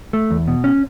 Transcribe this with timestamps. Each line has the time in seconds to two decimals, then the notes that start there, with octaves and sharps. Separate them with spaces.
0.13 A3
0.31 E2
0.48 B2
0.64 C#4